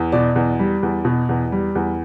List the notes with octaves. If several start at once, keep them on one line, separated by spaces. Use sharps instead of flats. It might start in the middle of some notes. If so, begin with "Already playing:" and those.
Already playing: E2
B2 D5
E2
G3
E2
B2
E2
G3
E2